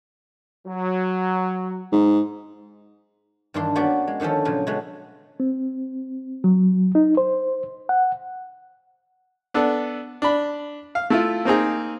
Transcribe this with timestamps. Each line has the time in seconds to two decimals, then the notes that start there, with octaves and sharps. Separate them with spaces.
0.66 F#3
1.92 G#2
3.54 G2 D#3 E3 D4 D5 C6
3.75 A#3 B3 C#4 F#4 G4 D5
4.08 G#3
4.20 D3 D#3 F3 C#4 A4
4.45 A#2 C#3 F3 F#3
4.67 C#3 G#3 A3 B3 F#4
5.40 C4
6.44 F#3
6.95 D#4
7.17 C5
7.89 F#5
9.54 B3 D4 A4
10.22 D4 B5
10.95 F5
11.10 A3 E4 F4
11.45 A#3 C4 D#4 G#4